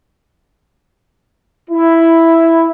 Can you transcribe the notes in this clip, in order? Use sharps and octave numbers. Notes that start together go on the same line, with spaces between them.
E4